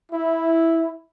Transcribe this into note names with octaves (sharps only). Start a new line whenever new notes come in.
E4